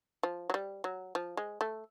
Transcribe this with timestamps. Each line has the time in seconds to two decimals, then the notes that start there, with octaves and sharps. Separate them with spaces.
0.23 F3
0.50 F#3
0.54 G3
0.84 F#3
1.15 F3
1.37 G#3
1.61 A3